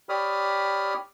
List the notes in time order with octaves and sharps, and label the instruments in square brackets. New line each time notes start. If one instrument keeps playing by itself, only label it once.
[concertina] G4 C#5 D5 B5 D#6 F6